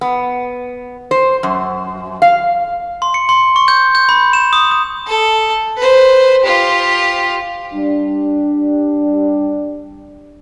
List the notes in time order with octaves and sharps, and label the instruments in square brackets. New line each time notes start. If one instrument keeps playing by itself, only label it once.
[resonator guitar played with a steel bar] B3
C5
F#2
F5
[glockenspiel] C6
C#7
C6
C#6
G6
G6
B5
E7
D#6
D#6
[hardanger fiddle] A4
B4 C5
F4 G4
[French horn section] G3 D4